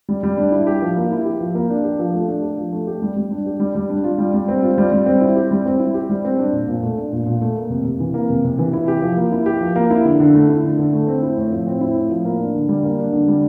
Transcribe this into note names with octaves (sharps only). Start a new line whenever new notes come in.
G3
G3
D4
E4
G4
F3
A#3
E4
G4
F3
A#3
D4
G4
F3
A3
D4
G4
F3
A3
G4
G3
G3
D4
G4
G3
G3
D4
F4
G3
G3
C4
F4
G3
G3
C4
E4
G4
G3
C4
E4
G4
G3
C4
D4
A#2
A#2
A3
D4
A#2
A#2
A3
A#3
C3
C3
E3
A#3
C3
C3
E3
E4
G4
F3
A#3
E4
G4
F3
A#3
E4
D3
D3
A3
E4
D3
D3
A3
C4
E4
A2
F3
C4
E4
A2
F3
A#3
D4
D3
G3
A#3
D4
D3
G3